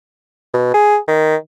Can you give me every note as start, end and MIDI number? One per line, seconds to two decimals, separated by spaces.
0.54 0.70 47
0.74 0.98 68
1.08 1.36 51